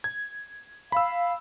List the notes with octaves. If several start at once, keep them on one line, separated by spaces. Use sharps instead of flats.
G#6
F5 B5 E6